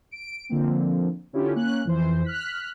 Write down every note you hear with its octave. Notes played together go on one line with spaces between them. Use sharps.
D7
D3 F3 A#3 C4
D3 C#4 E4 F4 G4
A#3 C#4 F#6
F2 E3 C5
F6 F#6 B6